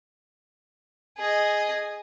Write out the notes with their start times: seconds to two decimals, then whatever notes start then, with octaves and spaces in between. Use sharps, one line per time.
1.17 G#4 D#5